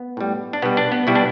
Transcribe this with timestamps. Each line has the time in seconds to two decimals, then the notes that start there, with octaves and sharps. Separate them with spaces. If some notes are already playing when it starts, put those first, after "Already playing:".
Already playing: B3
0.17 A2 G3
0.53 D4
0.62 B2 G3 B3
0.77 D4
0.92 B3
1.07 B2 G3 E4
1.15 D4